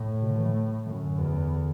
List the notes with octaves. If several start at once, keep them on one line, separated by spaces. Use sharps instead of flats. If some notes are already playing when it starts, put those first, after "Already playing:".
Already playing: A2
B2
D3
E3
A3
F#2 D3
E2